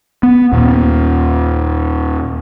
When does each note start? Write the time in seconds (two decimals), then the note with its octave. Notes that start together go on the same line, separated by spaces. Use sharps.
0.23 B3
0.53 D#2 A#2